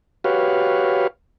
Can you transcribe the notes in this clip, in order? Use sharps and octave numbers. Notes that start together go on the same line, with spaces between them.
F#4 G4 B4 C#5 F5